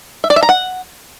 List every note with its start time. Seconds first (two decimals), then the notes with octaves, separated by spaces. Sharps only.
0.24 E5
0.30 D5
0.36 E5
0.43 A#5
0.49 F#5